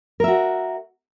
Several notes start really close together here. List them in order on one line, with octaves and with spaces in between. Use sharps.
A#4 E5 F#4